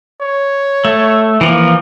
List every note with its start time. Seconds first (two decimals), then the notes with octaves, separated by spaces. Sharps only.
0.21 C#5
0.85 A3
1.41 E3 F3 A#3